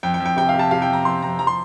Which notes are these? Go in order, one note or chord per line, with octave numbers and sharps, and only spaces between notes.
F2 G5
G5
F2
G5
C3 G5
F5
C3
A5
C3 F5
G5
F2
A#5
F2 C6
F2 A#5
F3 A#5
C6